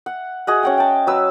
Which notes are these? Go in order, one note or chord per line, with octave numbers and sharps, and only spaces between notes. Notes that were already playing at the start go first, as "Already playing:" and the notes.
F#5
F#4 G#4 D#5 F#5
C#4 F#5 G5
G5 A5
F#3 B4 E6